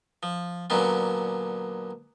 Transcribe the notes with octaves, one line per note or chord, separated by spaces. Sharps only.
F3
A#2 D3 F#3 B3 C#4